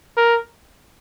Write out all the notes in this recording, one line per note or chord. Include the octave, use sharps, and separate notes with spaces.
A#4